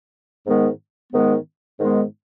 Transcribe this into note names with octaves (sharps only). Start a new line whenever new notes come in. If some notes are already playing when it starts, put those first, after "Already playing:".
G#2 D#3 G#3 B3
G#2 D#3 G#3 B3
G#2 D#3 G#3 B3